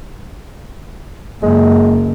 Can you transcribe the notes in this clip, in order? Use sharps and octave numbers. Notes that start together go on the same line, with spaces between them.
F#1 G#3